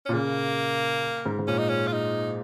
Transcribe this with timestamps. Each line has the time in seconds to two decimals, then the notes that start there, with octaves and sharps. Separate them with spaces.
0.06 A#2 C#4
0.13 C#3 A#3
1.26 G#2
1.39 G#2
1.47 A#2 C#4
1.58 D#4
1.69 C#4
1.87 F4
1.92 D#4